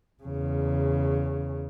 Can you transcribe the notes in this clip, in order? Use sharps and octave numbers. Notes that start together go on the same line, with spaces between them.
E2 C#3